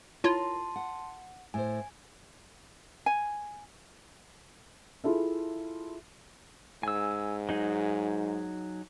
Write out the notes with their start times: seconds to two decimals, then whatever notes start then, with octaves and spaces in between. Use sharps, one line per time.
0.24 E4 F4 A#4 C#5 A5 C6
0.76 F#5
1.54 A2 C5 G#5
3.06 G#5
5.04 E4 F4 G#4 A4 E5
6.83 G#2 G#5 E6
7.49 F#3 D#4 G#4